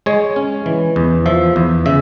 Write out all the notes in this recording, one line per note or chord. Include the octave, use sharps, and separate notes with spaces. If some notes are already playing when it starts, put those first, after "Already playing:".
G#3 C#5
C#4
E3
E2
F3 E5
E2
C#3 E5